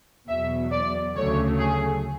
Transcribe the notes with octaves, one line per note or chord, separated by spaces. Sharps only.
E2 B2 F#3 E5
D5
D2 C#3 F#3 A3 C#5
G#4